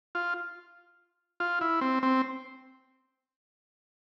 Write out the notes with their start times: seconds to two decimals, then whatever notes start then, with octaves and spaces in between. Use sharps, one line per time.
0.15 F4
1.40 F4
1.61 E4
1.81 C4
2.03 C4